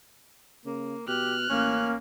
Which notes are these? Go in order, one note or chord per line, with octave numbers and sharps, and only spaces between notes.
C#3 A#3
B2 G4 F6 F#6
A1 A#3 C#4